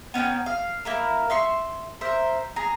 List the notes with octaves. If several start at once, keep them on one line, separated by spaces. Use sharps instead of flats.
B3 C#4 D#4 G5
F5
A#3 E4 A#4
E5 C6 C#6
A#4 C5 E5
G#4 A#5